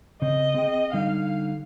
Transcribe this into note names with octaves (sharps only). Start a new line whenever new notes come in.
C#3 C4 D#5
C4 G#4 G5
D3 G3 D#4 F5